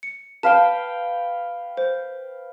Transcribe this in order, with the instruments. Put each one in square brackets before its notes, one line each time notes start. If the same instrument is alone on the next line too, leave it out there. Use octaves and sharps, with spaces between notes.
[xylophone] C#7
[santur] B4 F5 G5 [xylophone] A5 F6
[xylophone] C5